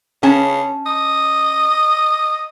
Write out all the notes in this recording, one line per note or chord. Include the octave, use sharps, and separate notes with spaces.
C#3 C#4 A5
D#5